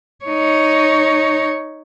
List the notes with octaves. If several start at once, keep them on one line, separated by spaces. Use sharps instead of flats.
D#4 C#5